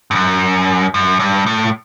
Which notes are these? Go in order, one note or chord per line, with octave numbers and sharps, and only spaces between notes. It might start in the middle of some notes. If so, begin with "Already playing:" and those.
G2
F#2
F#2
G2
A2